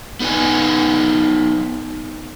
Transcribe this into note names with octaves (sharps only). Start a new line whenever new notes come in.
B3 D#4 B4 G#5